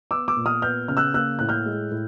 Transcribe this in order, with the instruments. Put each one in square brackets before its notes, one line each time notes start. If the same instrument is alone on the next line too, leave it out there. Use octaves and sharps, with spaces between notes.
[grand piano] B3 D6 E6
D6 E6
A#2
D#6 F6
B3 F6 G6
C#3 F6
E6 F#6
A#3 E6 F#6
A2 F#6
F6 G6
G#3
A2